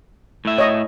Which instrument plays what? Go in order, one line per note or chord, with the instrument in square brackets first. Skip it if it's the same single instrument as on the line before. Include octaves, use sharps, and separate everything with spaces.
[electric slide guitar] A2 E5
[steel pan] C#5 D#5